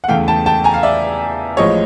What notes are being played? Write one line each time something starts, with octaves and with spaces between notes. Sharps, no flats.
F#5
E2 C#3 E3 A3 F5 G5
G5 A5
G5 A5
G#5 A#5
F5
D5 E5
A1 A2 F3 G#3 C#5 D#5